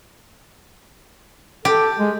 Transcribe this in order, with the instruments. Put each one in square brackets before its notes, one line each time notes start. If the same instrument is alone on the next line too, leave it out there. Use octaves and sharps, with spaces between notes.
[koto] G4 [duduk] A4
[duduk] G#3